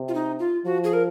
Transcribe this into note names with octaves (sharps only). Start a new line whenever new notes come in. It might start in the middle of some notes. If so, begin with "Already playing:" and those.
Already playing: C3
F4
D#4
F4
F3 F#4
G#4
A#4